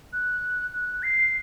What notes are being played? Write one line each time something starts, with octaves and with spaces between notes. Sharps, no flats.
F#6
F#6
C7